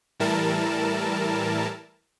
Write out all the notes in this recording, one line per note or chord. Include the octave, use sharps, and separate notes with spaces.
A2 E3 G3 E4 A#4 A5